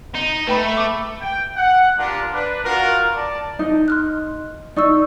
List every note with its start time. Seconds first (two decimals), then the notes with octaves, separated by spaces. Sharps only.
0.15 D#4
0.47 A3 B4 G5 B5
0.77 D6
1.21 G5
1.55 F#5
1.99 D4 F4 G4 A#4
2.34 D4 B4
2.64 F4 F#4 A#4
3.15 D5 A5
3.59 D#4
3.88 C6 F6 F#6
4.77 D#4 D5 C#6 E6